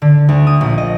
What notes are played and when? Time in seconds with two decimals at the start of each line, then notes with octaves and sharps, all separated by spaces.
0.02 D3
0.29 D2
0.47 D#6
0.61 A#1
0.78 D#5